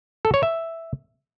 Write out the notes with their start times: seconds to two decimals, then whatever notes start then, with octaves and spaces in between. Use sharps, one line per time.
0.25 A4
0.34 C#5
0.43 E5